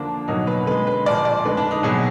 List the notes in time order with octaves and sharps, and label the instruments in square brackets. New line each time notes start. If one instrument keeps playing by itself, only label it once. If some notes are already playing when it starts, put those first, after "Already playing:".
Already playing: [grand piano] D3 F3 A#3 D4
B2 F#3 A#3 D#4
B4
D3 G#3 B4
B4
A#2 F3 A#3 D5
D5
D3 G#3 B4
D4
D#4
B2 F#3 A#3 G#4